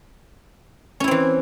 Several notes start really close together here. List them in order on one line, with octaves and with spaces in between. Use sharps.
C#4 E4 C4 E3